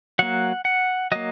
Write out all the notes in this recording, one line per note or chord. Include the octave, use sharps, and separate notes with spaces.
F#3 A#3 F#5
F#5
F#3 A#3 D#5